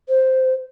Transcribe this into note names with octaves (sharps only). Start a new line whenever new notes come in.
C5